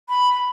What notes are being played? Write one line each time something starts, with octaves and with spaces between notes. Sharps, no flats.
B5